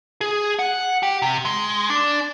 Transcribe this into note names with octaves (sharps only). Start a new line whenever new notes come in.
G#4
F#5
G4
C3
G#3
D4